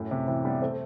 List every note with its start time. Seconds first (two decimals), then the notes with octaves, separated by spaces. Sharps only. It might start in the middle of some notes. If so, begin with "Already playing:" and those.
Already playing: F#2 A2
0.10 A2 C3
0.27 C3 E3
0.44 G3 B3
0.62 A3 C4